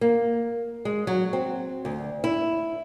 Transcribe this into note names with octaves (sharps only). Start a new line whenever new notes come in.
A#3
G#3
F#3
C4
D2
E4